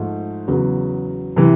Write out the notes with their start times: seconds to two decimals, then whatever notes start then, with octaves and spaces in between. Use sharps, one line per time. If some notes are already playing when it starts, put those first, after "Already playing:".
Already playing: G#2 F3 A3
0.48 E2 C#3 F#3
1.36 C3 E3